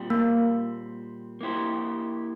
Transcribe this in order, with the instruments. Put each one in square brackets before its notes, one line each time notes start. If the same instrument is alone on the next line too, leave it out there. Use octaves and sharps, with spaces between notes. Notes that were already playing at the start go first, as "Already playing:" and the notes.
Already playing: [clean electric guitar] A#2 G3 C4
[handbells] A#3
[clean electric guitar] A#3 E4 G4 C5